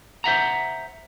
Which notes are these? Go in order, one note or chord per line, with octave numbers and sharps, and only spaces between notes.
C5 E5 F#5 A#5